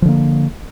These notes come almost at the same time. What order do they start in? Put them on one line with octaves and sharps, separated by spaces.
F3 D3 A#3